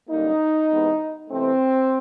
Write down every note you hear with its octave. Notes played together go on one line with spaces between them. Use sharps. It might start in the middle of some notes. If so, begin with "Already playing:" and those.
F#2 D3 G3 A#3 D#4
E2 C3 E3 G#3 B3
C3 E3 A3 C4